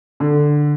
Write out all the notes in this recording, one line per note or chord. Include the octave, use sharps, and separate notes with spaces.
D3